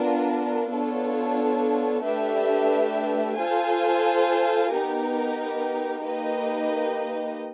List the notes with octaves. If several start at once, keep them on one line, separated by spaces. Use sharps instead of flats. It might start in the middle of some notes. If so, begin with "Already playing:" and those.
Already playing: B3 D4 F4 A#4
B3 D4 F4 A4 C#5
A3 D4 G4 B4 E5
F4 A4 C5 F5 G#5
B3 D#4 G4 A#4
A#3 D#4 G4 B4 D#5